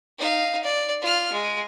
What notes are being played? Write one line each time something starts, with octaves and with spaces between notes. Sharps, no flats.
D#4 F5
D5
F4 F6
G#3